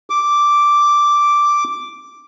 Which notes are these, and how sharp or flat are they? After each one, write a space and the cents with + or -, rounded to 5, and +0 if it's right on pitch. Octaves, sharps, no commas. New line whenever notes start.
D6 +0